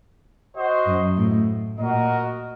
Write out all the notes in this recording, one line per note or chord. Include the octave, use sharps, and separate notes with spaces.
F#4 C5 D#5
F#2
A2
A#2 F#4 A#4 D#5